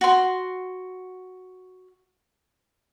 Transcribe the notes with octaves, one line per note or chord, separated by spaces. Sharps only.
F#4 C6